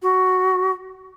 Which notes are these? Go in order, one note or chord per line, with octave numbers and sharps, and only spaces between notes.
F#4